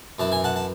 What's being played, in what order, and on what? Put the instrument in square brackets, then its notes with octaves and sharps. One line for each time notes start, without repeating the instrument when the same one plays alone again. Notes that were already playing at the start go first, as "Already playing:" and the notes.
[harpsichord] F#2 E3 A5
G#5
F#5 A5
A5